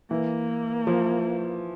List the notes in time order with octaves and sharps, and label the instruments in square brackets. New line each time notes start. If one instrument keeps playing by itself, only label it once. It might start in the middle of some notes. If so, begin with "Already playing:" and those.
[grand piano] E3 [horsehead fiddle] A#3
[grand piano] F3